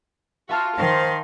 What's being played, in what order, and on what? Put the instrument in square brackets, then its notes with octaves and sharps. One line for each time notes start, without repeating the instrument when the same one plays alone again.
[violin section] F4 F#4 [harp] E5 A5 F6
[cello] D#3 [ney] C5 [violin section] F5 C6